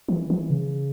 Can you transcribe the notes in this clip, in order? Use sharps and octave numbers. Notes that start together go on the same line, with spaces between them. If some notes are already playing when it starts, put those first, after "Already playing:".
E3
E3
C#3